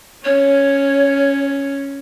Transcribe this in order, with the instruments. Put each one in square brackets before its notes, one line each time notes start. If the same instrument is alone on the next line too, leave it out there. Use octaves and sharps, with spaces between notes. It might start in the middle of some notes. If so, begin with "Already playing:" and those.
[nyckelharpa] C#4 [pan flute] C#5